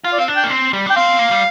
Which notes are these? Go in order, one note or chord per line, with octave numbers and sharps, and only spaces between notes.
F4 F5
D5
C4 F5
D4
G5
A#3
C4
G3
D4 G5
C4 F5
A#3
G3